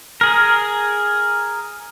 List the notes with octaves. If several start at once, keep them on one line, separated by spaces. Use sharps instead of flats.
G#4 A#4